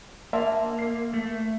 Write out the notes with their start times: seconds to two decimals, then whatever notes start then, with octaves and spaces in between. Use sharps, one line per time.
0.33 A#3 E5 A5 C6
0.79 C7
1.14 A3